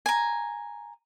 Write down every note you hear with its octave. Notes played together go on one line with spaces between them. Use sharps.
G#5 A#5